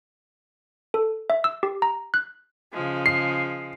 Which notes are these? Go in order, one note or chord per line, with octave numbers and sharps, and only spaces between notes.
A4
E5
E6
G4
A#5
F#6
C#3 F3 G#3
C7